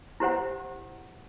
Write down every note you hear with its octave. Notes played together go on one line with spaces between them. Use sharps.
E4 G4 C5 F#5